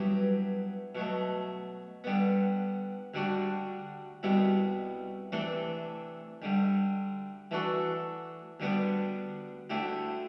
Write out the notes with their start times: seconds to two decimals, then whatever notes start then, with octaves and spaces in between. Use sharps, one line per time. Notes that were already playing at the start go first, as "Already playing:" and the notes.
Already playing: G2 F#3 B3 E4 G4
0.95 B2 F#3 A3
2.04 D3 G3 B3
3.14 D2 D3 G3 D4 F#4
4.23 C2 B2 G3 B3 E4
5.32 C3 E3 A3 D4 A4
6.42 D2 D3 G3
7.51 E3 A3 D4 F#4 A4
8.60 D2 D3 G3 B3 D4
9.70 D2 D3 A3 E4 G4